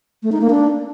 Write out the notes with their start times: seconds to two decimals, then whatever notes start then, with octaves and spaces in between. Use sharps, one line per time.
0.23 A3
0.32 D#4
0.41 A#3
0.50 D4